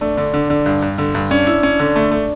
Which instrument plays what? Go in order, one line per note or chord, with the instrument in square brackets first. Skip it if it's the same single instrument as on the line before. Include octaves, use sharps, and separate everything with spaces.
[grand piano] A3 [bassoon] D4
[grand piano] D3
D3
D3
G2
G2
D3
G2
[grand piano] C#4 [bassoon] D4
[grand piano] E4
C#4
D3
A3
A3